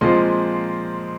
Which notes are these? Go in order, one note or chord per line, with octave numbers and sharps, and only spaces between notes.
A#2 F3 G#3 C4 C6